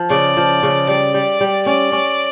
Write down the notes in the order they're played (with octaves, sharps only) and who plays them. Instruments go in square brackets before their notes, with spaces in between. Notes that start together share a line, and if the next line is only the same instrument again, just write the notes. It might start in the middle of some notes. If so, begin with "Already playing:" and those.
Already playing: [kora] F3
[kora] C#3 [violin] D5
[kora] F3
C#3
[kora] G3 [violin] D5
[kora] G3
G3
[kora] C#4 [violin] D5
[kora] C#4